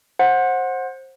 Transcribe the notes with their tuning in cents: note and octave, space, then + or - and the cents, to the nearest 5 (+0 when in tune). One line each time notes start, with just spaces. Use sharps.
C5 +20 F#5 -15